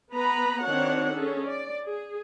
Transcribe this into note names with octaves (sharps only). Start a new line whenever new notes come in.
B3 B4 A#5 B5
D#3 C4 D4 F#4 C#5 F#5
C#4 G#4 A4
D5
G#4